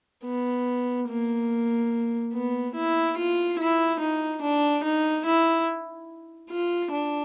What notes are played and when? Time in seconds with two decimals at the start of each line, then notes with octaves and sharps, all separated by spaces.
0.25 B3
1.08 A#3
2.34 B3
2.75 E4
3.17 F4
3.59 E4
4.00 D#4
4.42 D4
4.84 D#4
5.25 E4
6.50 F4
6.92 D4